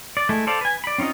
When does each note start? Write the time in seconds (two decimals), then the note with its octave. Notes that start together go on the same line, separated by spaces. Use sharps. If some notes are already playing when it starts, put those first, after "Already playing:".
0.17 D5
0.29 G#3 A3 E4
0.47 A4 C5 D5 F5
0.61 B4 G#5
0.84 D5 B5
0.98 C4 C#4 D#4 F4 D#5